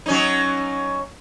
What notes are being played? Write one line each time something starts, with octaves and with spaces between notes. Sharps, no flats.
F#3 C#4 D#4